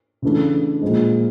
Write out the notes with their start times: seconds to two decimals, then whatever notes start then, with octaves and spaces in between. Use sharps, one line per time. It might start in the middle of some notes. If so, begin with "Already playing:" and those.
0.22 C#3 E3 A3 D4
0.82 A#2 F3 G#3